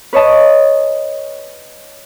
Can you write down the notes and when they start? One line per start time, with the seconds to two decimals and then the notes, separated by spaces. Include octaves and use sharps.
0.13 B4 C#5 D#5 A5